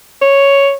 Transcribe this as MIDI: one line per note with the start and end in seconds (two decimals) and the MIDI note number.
0.22 0.75 73